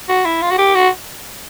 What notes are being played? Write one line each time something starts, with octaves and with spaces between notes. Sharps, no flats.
F#4
E4
F4
F#4
G4
F#4